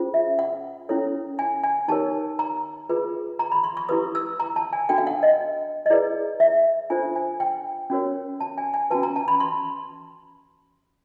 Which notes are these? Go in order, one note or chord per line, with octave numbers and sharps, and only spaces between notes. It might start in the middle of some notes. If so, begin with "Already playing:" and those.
Already playing: C#4 F4 G#4 C5
E5
F#5
C#4 E4 A4 C#5
G#5
G#5
D#4 G4 A#4 C#5 A5
A#5
F4 G#4 B4
A#5
B5
C6
C#6
E4 G4 B4 D#6
E6
A#5
A5
G#5
D4 F#4 A4 G5
F5
F#5
D#5
D#5
E4 G#4 B4 D5
E5
D4 F4 A4 C5 G#5
G#5
G5
C#4 F#4 A#4 C#5
A5
G#5
G#5
C#4 F#4 B4 A5
A#5
A5
B5
C6